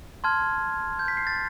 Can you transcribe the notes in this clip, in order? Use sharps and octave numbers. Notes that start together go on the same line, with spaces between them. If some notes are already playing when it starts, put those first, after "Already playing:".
A5 C6 F6 G#6
G6
B6
C7
A6